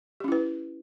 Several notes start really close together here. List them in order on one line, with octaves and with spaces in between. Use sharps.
G4 C#4 E4 B4